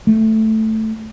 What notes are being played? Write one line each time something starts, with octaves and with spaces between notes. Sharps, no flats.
A3